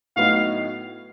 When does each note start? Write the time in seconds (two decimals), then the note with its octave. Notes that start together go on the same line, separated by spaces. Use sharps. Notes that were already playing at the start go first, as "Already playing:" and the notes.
0.16 A2 F#3 B3 D#4 F5